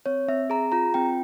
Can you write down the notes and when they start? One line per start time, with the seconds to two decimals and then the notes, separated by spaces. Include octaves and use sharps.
0.06 C4 C#5
0.28 C4 E5
0.50 G#4 A#5
0.72 F4 A#5
0.94 C4 G5